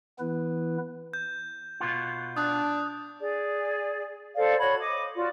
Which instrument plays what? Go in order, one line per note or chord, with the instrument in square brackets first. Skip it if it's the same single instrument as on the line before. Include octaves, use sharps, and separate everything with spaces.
[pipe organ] E3 B3 E4 B4
[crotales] G6
[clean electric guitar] B2 B3 F4
[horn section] D4 [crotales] D#6 F#6
[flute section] G#4 D5
A4 C5 D5 F5
F#4 C#5 B5 G#6
D#5 D6
F4 F#4 D5